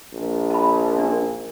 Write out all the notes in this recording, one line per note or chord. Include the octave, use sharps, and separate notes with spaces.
A#1
A5 B5
D4 A#4